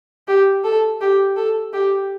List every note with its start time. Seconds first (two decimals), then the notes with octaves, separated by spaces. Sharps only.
0.28 G4
0.64 A4
1.01 G4
1.36 A4
1.73 G4